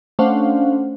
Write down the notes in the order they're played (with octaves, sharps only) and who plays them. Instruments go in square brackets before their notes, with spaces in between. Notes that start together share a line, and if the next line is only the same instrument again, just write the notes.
[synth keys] A3 C#4 D4 C5 F5 F#5